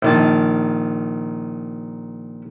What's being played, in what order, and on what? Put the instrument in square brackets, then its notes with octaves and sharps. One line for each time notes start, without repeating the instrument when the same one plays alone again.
[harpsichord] A#1 D#3 A5